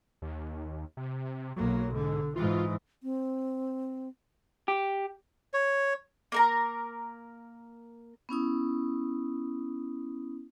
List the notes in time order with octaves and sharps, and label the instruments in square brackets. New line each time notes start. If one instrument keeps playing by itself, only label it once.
[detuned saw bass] D#2
C3
[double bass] B1 A#3 [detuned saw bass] F#3
[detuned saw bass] G#2 [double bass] D3
[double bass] G#2 E3 [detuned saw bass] F4
[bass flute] C4
[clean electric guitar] G4
[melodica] C#5
[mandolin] A#3 A#4 A#5
[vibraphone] B3 C#4 E4 D#6